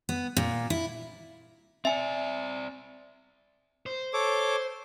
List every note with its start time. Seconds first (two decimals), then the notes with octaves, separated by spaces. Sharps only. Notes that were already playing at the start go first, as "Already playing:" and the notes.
0.09 B3
0.37 A#2
0.70 E4
1.85 C4 D5 E5 G#5
3.86 C5
4.13 A4 C#5 D6